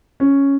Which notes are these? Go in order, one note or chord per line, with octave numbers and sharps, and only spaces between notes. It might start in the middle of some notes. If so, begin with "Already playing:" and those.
C#4